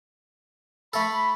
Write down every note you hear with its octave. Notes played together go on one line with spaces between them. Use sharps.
A3 A4 B5